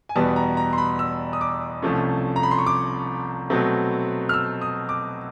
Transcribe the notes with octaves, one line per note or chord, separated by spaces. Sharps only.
G#5
E2 B2 G3 B3 A5
A#5
A#5
C6
B5
E6
D#6
D6
C2 C3 F3 A3 C#4
A#5
B5
C6
C#6
D6
B2 F#3 A3 C4
F6
E6
D#6
D6